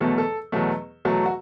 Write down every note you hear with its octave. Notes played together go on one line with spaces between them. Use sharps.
E2 B2 F#3 A3 A4
A4
E2 B2 F#3 A3
E2 B2 F#3 A3
F#4